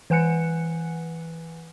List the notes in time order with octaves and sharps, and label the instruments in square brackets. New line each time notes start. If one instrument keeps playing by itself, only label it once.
[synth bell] E3 B4 F#5 G#5 F#6 C#7